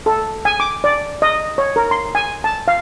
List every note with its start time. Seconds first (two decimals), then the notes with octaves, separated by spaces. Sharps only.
0.06 A4
0.45 G#5
0.60 D6
0.84 D5
1.22 D#5
1.58 C#5
1.76 A#4
1.91 C6
2.15 G#5
2.44 A5
2.68 F5